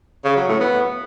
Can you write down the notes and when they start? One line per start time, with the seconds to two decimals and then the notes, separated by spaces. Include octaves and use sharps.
0.25 C#3
0.36 F#3
0.48 A2
0.60 B3